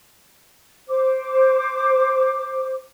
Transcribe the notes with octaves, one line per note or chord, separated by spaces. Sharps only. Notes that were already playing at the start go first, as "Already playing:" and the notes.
C5 D6